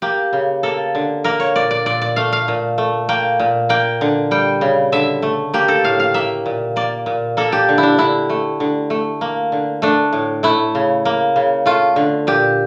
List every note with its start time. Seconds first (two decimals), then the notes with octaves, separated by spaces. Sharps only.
0.02 A#3 G4
0.33 C#3
0.63 A#3 A4
0.95 D3
1.24 A#3 A#4
1.40 C#5
1.56 A#2 D5
1.71 D5
1.86 A#2 D5
2.02 D5
2.16 A3 F5
2.33 F5
2.48 A#2
2.78 A3
3.09 A#3 G5
3.39 A#2
3.69 A#3 G5
4.01 D3
4.31 G3 G5
4.61 C#3
4.92 D3 E5
5.22 A3
5.54 A#3 G4
5.68 A4
5.84 A2 F5
6.00 F5
6.14 A#3 E5
6.46 A#2
6.76 A#3 D5
7.06 A#2
7.37 A#3 A4
7.52 G4
7.69 D3
7.78 E4
7.83 D4
7.98 D3 E4
8.30 A3
8.60 D3
8.90 A3
9.21 A#3
9.52 D3
9.82 A3 D4
10.13 A2
10.43 A3 E4
10.75 C#3
11.05 A#3
11.36 C#3
11.66 A3 F4
11.96 D3
12.27 A#2 G4